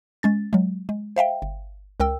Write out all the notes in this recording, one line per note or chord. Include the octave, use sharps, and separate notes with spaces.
G#3 C#4 A6
F#3 G#3
G#3
C5 E5 F5 G5
G1
C#2 A#4 G5 E6